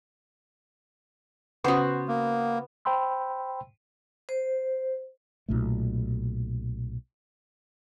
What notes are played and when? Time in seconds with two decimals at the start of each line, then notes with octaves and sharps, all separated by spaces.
1.64 C#3 B3 C#4 F#4 C5 D#6
2.08 A#3
2.85 C5 G5 B5 C6 E6
4.29 C5
5.48 B1 A#2 A3